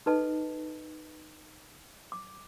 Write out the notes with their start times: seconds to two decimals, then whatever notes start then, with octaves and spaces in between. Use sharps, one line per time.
0.06 D#4 A4 B4 D#5 A5
2.12 D6